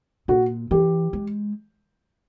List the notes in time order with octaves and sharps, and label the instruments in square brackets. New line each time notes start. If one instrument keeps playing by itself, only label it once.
[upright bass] A#2 [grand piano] F#4
[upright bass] E3 [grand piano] G4
[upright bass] G#3